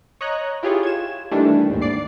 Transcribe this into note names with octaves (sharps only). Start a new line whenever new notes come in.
C#5 D#5 A#5 F#6
E4 F4 G4 G#4 C#5
G#6 E7
D#3 E3 G3 A3 D4
D#2 G#2
D5 C7